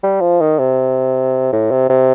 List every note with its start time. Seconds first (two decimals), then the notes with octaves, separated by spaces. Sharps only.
0.03 G3
0.21 F3
0.41 D#3
0.59 C3
1.53 A2
1.71 C3
1.89 C3